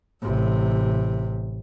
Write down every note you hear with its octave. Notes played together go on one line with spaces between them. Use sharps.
A1 C3